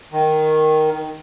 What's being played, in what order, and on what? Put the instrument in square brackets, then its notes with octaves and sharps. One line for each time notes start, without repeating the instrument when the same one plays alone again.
[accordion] D#3